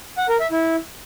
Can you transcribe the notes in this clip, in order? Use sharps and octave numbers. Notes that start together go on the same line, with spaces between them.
F#5
A#4
E5
E4